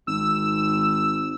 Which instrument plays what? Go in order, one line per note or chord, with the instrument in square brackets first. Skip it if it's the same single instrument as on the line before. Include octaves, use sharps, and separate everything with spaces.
[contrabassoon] G#1 [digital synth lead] E6